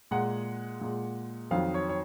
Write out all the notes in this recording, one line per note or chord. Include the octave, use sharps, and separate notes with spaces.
A#2 G#3 F#5
A#2 G#3
F2 D#3 F#3 F5
C#5
C#5